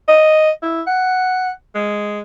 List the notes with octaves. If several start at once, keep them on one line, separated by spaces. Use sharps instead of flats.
D#5
E4
F#5
G#3